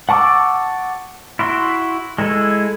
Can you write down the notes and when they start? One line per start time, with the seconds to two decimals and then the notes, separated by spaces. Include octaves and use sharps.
0.09 F#5 A5 C#6 D6 E6
1.39 E4 F#4 C6
2.19 G#3 E4 A4 G#5